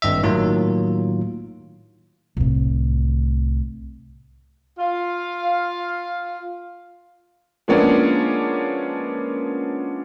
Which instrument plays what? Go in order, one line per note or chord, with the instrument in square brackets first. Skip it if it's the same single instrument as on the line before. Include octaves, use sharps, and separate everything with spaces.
[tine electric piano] G#1 G2 D#5 E5
A2 D#3 F#3 A#3 F4
[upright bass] C2 A2
[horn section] F4 F5
[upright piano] F3 G#3 A#3 B3 C#4 D4